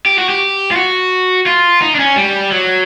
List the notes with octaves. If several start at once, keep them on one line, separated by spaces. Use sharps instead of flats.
G4
F#4
G4
F4
F#4
F4
D#4
D4
C#4
G3
F#3